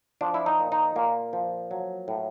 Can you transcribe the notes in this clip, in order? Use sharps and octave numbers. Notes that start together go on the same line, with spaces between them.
F3 D4
E4
D#4
A#2
D#4
A#2 A#3
F3
F#3
A2